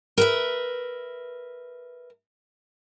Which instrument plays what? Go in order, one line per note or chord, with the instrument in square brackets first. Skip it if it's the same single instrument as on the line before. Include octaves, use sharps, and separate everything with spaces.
[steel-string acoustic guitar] A#4 B4 E5